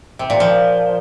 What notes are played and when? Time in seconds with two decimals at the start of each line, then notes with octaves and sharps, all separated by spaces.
0.19 C3
0.30 A#2
0.40 F3